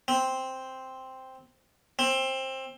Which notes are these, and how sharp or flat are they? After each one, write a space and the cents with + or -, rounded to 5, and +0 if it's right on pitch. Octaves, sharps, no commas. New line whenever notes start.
C4 +0
C4 +20